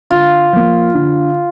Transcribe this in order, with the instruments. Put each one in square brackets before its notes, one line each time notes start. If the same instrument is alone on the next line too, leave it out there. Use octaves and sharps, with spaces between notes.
[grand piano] D3 [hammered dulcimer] F4
[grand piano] F3 A#3
D3